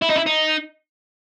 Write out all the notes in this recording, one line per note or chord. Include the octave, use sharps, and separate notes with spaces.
E4
D#4
E4
D#4